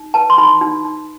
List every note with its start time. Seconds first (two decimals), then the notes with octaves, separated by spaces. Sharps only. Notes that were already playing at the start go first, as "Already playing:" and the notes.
Already playing: D#4
0.14 B4 A5
0.30 C6
0.38 D#4 B5
0.61 D#4
0.85 D#4